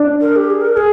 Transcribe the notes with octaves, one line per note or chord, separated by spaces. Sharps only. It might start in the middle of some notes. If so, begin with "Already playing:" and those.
Already playing: D4
A#4
G4
G#4
A#4
A#4
G#4